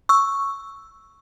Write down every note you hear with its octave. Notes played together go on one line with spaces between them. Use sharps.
C#6 E6